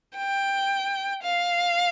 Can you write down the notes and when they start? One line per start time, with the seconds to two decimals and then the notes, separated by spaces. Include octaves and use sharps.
0.17 G5
1.23 F5